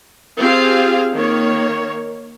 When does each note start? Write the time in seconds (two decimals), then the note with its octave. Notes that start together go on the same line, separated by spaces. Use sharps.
0.39 C4 F4 G4 G#4 C5 F5
1.14 D#3 A#3 C#5